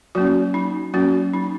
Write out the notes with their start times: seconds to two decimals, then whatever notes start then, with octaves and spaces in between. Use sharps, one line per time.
0.15 F#3 A#3 C#4 F#4
0.54 D#4
0.94 F#3 A#3 C#4 F#4
1.33 D#4